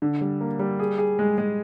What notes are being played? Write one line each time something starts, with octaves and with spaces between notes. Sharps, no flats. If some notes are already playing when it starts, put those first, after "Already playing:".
D3
G3
A#3
G3
G#4
G#4
G#3
G#3